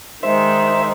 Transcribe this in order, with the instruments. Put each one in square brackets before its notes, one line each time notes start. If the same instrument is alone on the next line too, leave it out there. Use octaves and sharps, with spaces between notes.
[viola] D#3 G#3 [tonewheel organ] C5 E5